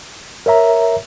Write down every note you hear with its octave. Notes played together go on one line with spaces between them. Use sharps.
A#4 C#5 E5 A#5